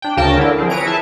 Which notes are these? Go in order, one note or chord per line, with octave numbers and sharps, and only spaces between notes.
D4 G5
D2 C#3 A#4 G5 A5
D3 E4 A#4
F3 C4 G#4
A#4 B4 C#5 A#5 D7
E4 G#4 B4 E5 A5